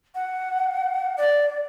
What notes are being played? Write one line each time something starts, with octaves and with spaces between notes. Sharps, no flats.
F#5
D5